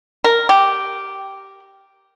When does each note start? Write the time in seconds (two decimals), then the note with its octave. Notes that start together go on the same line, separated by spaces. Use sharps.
0.24 A#4
0.49 G4